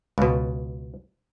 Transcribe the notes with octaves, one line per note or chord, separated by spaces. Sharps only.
C#2 B2